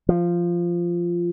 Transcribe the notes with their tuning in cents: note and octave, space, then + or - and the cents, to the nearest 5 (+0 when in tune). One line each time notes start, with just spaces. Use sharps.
F3 -10